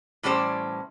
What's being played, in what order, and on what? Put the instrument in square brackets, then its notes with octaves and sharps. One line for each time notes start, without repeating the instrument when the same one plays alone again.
[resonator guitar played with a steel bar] A2 E3 G3 C#4 G4 C5